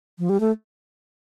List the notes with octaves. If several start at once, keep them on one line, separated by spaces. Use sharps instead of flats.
F3
G3
A3